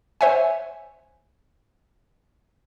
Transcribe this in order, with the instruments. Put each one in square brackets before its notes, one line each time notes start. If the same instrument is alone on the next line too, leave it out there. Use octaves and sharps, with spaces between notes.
[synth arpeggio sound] C5 C#5 E5 F#5 G#5